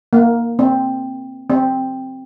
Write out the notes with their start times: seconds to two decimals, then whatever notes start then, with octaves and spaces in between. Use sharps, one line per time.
0.13 A#3
0.59 C4
1.50 C4